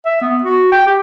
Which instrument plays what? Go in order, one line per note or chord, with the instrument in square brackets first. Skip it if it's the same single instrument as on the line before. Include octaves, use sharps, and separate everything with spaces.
[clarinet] E5
B3
F#4
G5
G4